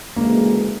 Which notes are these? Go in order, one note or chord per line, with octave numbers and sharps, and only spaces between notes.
D2 C#3 E3 G#3 A#3